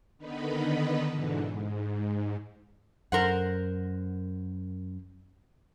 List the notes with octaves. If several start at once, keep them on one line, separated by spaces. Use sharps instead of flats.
D3 D#3 B3 D#4 B4
G#2 B2 D3 E3
G#2
F#2 A#4 C5 F#5